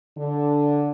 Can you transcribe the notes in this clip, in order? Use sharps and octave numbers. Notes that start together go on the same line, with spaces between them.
D3